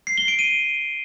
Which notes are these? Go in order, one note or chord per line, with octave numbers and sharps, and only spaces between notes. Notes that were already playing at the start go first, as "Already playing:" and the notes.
C7
G7
D7
D#7